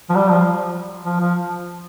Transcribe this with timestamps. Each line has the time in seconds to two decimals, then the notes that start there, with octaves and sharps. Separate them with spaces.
0.10 F3
0.15 G3
0.29 F3
1.05 F3
1.21 F3